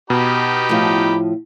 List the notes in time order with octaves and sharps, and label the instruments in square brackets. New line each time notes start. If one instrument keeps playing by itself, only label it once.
[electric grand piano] B2 [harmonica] D#4 G4 B5
[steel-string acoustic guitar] A2 F3